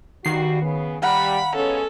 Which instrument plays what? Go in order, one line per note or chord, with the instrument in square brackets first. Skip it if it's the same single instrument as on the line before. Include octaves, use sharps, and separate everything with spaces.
[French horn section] G2 G3 F#4 [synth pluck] D#3 C7
[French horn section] C#3 B3
[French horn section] G3 [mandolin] F5 F#5 A#5 [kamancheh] B5
[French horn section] G#3 B3 C#4 [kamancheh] A4